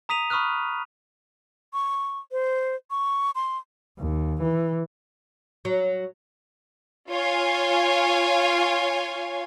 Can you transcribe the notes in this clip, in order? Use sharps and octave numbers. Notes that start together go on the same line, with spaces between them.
A#5 D#6 B6 D#7 F7
B5 C#6 D#6 F6 F#6
C#6
C5
C#6
C6
D#2
E3
F#3
F4 C#5 F5 G#5